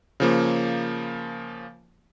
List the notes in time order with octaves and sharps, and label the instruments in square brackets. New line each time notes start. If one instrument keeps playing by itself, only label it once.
[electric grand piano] C#3 F3 A#3